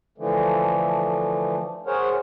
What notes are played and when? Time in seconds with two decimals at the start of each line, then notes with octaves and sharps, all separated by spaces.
0.18 D3 E3 F3 A3
1.87 G#4 A#4 C5 C#5 F#5